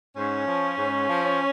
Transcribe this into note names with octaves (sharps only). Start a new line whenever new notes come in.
G#2 C#4
F3
G#2
F3